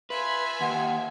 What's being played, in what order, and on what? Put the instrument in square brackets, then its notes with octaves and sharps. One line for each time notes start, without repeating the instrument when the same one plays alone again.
[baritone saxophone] F4 [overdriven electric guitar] B4 [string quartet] E5 G#5
[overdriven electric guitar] D#2 [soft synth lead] F#5